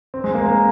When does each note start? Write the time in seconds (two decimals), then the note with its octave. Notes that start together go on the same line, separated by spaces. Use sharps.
0.14 C4
0.24 G#3
0.35 A#3
0.45 A#3